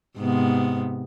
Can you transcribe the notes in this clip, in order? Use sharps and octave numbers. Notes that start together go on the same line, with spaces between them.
G#2 C3 B3